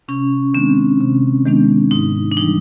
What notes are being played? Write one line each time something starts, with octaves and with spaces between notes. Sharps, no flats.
C3 C#4
D#3 G#3 B3 C4 D4
C3
D#3 G#3 B3 D4
G#2 D#4
D4
E3 G3 D#4